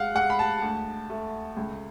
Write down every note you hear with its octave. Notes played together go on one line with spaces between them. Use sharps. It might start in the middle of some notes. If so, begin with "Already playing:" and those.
Already playing: G#3 F5 F#5
G#3 F#5
B5
A5
D2
A3
C#2